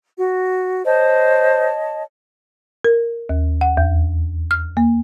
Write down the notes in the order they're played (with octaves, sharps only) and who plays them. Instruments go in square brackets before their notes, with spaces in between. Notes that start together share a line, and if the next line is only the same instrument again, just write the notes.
[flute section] F#4
[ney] C5 [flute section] C#5 D#5 A5
[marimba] A#4
D#2
F#5
E2
F6
A#3